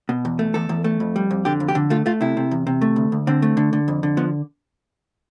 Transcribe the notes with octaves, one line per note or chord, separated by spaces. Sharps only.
B2
E2
A3
E2 A4
E2
A3
F2
G3
F2
D3 G4
F2
G4
D3
A3 F4
A3 F4
C3 E4
C3
E2
C3
A3
D2
D2
D3 C4
A3
D3
D3
F2
D3
F3 B3